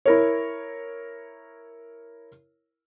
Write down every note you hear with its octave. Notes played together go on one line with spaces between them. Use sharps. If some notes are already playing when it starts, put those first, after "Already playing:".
E4 A#4 C#5